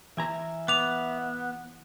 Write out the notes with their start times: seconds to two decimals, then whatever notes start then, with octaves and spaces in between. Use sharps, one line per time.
0.17 E3 E5 G#5 A#5
0.68 B3 D6 F7